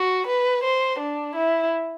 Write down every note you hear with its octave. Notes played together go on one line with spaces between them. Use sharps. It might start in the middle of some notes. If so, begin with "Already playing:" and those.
Already playing: F#4
B4
C5
D4
E4